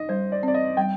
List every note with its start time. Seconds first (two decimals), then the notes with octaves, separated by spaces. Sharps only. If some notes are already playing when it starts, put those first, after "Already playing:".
Already playing: D#4 D#5
0.09 G3 C5
0.32 D5
0.43 C4 D5
0.54 D#5
0.77 G3 G5